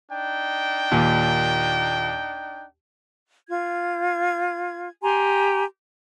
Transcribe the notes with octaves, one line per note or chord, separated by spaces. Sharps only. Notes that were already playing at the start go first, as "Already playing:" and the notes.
D4 D#4 G5
D#2 A#2
F4 G#6
G4 G#5 A#5 C6